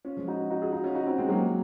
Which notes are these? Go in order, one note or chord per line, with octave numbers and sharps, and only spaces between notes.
C#4 F4
F3 G#3
D#4 F#4
D#4 F#4
F4 G#4
D#4 F#4
C#4 F4
D#4 F#4
C4 D#4
G#3 C4
F#3 A#3